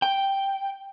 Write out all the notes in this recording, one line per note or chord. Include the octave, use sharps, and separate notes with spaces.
G5